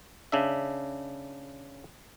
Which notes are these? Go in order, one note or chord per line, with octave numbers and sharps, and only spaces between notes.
C#3 D4 E5